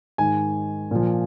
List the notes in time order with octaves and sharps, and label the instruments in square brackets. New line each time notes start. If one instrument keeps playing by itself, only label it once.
[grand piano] G#2 D#3 G#5
A#2 F3